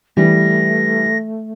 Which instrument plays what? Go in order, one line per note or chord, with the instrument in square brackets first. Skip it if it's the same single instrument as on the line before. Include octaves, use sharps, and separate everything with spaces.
[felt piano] E3 [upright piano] G3 [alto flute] A3 [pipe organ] A#6